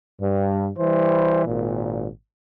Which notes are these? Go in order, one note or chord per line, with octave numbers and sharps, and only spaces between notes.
G2
E3 G3 C5
G#1 A#2